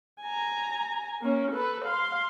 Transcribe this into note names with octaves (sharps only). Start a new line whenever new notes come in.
G#5 A#5
A#3 C#4
A4 B4
F5 C6